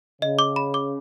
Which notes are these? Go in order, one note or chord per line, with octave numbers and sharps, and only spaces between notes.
C#3 D#5
D6
B5
D6